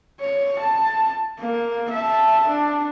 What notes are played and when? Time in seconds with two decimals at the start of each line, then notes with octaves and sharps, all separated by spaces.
0.20 C#5
0.59 A5
1.39 A#3
1.91 E5 A5
2.48 D4